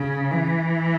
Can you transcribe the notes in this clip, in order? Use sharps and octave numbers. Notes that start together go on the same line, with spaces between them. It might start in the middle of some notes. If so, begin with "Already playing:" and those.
Already playing: C#3
E3